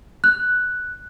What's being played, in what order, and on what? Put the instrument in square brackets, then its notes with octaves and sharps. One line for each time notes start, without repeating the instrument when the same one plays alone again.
[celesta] F#6